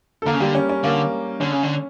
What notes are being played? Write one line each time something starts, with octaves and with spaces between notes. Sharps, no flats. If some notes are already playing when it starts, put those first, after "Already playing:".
A4
D3 A#3 A#4
C#3
D3 G3 G4
C#4
C#4
D3 A#3
D3 C#4
C#3
D3